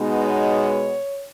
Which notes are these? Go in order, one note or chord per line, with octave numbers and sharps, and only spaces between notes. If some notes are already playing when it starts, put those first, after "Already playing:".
Already playing: B2 G#3 B3 D#4
C#5